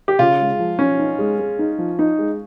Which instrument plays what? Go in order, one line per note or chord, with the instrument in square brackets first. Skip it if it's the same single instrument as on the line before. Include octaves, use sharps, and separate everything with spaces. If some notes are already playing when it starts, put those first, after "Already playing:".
[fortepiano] G4
[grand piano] C#3 [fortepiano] F4
[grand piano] G#3
F3
[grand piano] F3 [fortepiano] C#4
[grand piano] D#4
G#3
G#3
D#4
F3
D#4
G#3